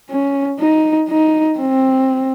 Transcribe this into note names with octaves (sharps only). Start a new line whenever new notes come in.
C#4
D#4
D#4
C4